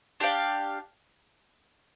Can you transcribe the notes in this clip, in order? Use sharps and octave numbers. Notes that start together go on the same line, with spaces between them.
D4 G4 D5 F5